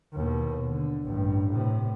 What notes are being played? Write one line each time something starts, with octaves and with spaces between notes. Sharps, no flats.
D#2 B2
D3
A1 G2
A2 C3